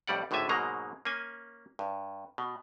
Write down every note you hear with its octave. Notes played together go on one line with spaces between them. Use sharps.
F2 A2 G3 D5 F#5
G#1 A2 D3 A3 E5 G#5
G#2 B2 F#3 G#3 A#3 A#5
A#3 C#4 G#5
G2
B2